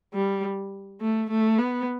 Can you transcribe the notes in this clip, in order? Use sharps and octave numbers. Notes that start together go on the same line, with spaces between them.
G3
A3
A3
B3